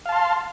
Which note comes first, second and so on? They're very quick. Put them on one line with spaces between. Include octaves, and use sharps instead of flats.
F5 A5 C6